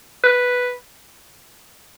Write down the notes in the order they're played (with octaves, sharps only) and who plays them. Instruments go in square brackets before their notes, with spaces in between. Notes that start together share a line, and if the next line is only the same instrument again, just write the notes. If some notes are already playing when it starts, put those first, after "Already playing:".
[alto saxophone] B4